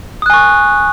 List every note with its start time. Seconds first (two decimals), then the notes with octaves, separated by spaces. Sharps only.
0.22 D#6
0.26 F#6
0.30 G#5
0.34 C#6